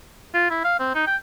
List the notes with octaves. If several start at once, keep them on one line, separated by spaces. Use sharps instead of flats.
F4
E4
F5
C4
D#4
G5